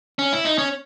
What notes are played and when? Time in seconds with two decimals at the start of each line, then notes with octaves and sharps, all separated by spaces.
0.19 C#4
0.33 E4
0.45 D#4
0.58 C#4